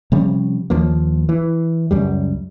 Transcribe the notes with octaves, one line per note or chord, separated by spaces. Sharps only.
C3 F3 G3 C#4
D#2 F3 A#3
E3
C#2 F#2 G3